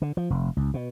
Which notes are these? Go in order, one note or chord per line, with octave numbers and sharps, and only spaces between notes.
D3
F3
F1
C#2
B2